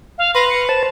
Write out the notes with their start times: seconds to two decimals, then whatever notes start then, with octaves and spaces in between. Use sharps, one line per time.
0.18 F5
0.35 B4 C6 A#6
0.50 C#7
0.69 C5 A5 E7